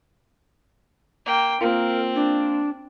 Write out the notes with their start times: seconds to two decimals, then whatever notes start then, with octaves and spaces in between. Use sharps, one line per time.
1.26 A#3 G5
1.61 A#3 C4 F4 A#4
2.15 D4